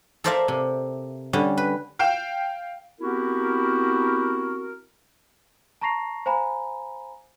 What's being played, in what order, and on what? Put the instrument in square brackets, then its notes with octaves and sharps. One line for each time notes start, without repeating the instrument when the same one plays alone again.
[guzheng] A4 A#4 C5 D5 E5 F5
C3
D3 G3 C#4
B4
[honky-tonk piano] F5 G5 E7
[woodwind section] B3 C4 E4 F#4 G4 A#4
[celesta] A5 A#5 C#6 A#6 C7 F7
C5 F5 G#5 A#5 B5